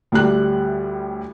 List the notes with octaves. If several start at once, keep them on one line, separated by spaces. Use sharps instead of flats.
D2 A2 G3 F#6